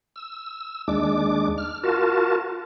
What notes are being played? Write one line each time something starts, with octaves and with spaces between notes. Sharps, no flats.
E6
D#2 G#3 D4 D6
F6
F4 F#4 A#4 A5